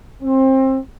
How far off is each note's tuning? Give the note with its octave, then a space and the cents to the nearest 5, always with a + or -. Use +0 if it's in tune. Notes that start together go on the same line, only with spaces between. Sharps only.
C4 +25